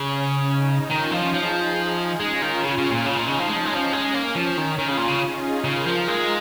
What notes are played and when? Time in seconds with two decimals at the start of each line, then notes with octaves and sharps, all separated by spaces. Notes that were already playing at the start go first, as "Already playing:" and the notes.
Already playing: C#3 C#4
0.48 D#4
0.90 D#3 C#4 F4
1.12 F3
1.33 F3 D#4 G#4
1.77 D#4
2.19 G#3 C#4 F4
2.42 D#3
2.64 C#3
2.78 C#3
2.91 A#2
3.06 C#3 D#4
3.17 A#2
3.28 C#3
3.39 F3
3.48 G#3 C#4
3.56 F3
3.65 G#3
3.74 F3
3.92 G#3 C#4
4.14 A#3
4.35 F3 C#4
4.58 D#3
4.78 D#3 C#4 F4
4.88 C#3
4.97 A#2
5.08 C#3
5.21 D#4 G#4
5.64 C#3 F4 A#4
5.86 F3
6.07 G#3 D#4 G#4